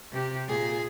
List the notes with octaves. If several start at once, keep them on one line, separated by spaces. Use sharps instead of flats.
C3 G4
A#2 G#4